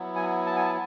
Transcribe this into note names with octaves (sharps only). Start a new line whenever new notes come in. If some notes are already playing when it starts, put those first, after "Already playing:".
Already playing: F#3 B3 E4
G#5
A5
G#5
A5